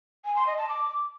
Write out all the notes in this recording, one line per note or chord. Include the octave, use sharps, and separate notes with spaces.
G#5
C6
D#5
A5
D6